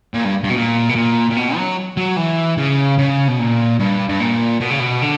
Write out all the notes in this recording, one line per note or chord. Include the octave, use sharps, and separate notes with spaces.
A#2
G2
G2
B2
A#2
B2
A#2
A#2
B2
F#3
F#3
E3
C#3
C#3
B2
A#2
G2
G2
A#2
B2
C#3
B2
D3